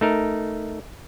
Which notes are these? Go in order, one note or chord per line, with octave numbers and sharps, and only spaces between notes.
A3 D#4 A#4